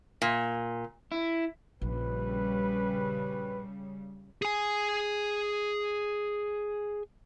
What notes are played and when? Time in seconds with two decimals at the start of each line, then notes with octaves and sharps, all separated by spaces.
0.22 A#2
1.12 E4
1.81 A#1 C#3 G3 B4
4.42 G#4 G#5